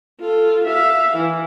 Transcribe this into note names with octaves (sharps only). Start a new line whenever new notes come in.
F4 A4
E5 F5
E3